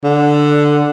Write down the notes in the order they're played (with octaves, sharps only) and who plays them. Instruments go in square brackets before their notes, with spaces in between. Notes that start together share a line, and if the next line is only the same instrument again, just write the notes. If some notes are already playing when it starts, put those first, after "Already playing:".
[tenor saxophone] D3